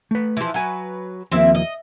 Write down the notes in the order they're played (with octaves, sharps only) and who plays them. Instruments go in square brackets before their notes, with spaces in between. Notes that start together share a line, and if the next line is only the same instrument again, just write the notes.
[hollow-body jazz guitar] A3 B4
[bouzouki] E3 F3
[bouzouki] F#3 B4 [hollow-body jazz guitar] F#5 G#5
[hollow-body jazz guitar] D#2 F3 A#3 [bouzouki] C4 E4 E5
[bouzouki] D#5